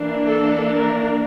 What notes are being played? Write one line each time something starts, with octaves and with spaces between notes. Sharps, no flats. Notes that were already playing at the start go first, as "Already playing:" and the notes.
Already playing: E3 A#3 D4
A4
A#4